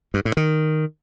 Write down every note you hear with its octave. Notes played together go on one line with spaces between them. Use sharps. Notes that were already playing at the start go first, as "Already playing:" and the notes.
G2
A2
D#3